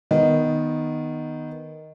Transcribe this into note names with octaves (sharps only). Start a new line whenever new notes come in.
D#3 B3 D#5